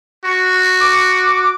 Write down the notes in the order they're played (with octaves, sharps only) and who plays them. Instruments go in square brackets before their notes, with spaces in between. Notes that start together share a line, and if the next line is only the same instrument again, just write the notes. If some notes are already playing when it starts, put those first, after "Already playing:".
[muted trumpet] F#4 [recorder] C#6
[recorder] D6